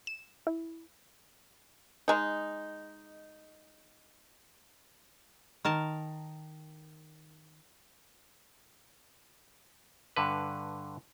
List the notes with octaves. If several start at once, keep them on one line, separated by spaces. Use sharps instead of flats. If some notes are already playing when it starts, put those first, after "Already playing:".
E7
E4
G#3 D#4
D#3 A#4 A5
G2 D3 B4